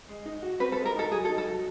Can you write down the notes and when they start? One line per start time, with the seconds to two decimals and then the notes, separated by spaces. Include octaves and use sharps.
0.08 G#3
0.25 D#4
0.42 F#4
0.60 C4 B4
0.72 A4
0.78 G#3
0.86 A#4
0.94 D#4 A4
1.12 F#3 G#4
1.25 A4
1.29 D#4
1.38 A4
1.46 F#3